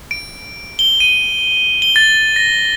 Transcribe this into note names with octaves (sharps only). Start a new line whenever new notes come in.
D7
G7
D#7
G7
A6
A#6